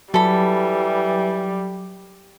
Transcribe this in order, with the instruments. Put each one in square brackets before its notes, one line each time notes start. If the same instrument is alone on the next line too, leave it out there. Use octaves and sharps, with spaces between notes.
[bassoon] E3 [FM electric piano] F#3 [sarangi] G3 [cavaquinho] A4 B5